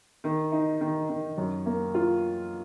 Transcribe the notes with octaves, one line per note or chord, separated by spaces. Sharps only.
D#3
D#4
D#3
D#3
F#2
A#3
F4